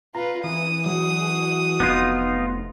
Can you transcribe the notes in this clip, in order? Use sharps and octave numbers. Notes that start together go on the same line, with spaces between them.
F4 B4 A#5
E3 D#6
F#3 F#4 D#6
F1 B3 D#4 F4